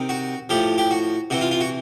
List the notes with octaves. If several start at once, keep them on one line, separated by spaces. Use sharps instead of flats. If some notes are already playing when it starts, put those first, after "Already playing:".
Already playing: C3 D#3
F#4
A2 F3 G4
G4
F#4
C3 E3 F#4
F4
F4
F#4